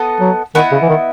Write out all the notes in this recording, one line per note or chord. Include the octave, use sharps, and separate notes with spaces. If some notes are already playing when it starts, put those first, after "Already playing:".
Already playing: B3 A4 D#5
F#3
D#3 B3 E4 A4 D#5
C#3
E3
D#3